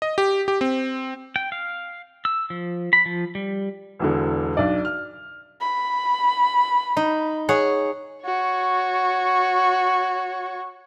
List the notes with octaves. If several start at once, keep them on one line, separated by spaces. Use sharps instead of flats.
D#5
G4
G4
C4
G5
F5
E6
F3
B5
F3
G3
E1 E2 D3
B1 D4 D5
F6
B5
D#4
G#4 C#5 F#5
F#4 C#5